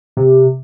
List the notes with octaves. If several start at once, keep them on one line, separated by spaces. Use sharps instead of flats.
C3